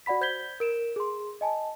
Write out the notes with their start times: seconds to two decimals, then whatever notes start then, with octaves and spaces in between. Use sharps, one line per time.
0.06 F#4 D5 F#5 B5 B6
0.21 C5 G6 G#6 B6 G7
0.60 A#4 D7 E7
0.96 G#4 C6
1.41 D#5 G#5 A5